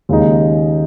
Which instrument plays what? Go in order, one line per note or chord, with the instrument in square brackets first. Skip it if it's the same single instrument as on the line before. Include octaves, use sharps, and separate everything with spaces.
[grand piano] D#2 C#3 G#3 D#4